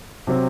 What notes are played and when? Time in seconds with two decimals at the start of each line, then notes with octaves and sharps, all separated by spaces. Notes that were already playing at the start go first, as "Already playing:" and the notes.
0.27 C3 F#3 C4